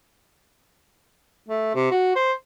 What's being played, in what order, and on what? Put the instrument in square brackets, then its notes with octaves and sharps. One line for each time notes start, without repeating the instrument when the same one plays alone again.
[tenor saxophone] A3
C3
F#4
C5